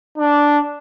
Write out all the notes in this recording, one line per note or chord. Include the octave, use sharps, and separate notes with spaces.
D4